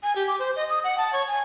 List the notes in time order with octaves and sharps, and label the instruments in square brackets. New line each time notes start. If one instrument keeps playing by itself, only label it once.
[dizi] G#5
G4
D6
C5
D#5
D#6
F#5
A5
C#5
G#5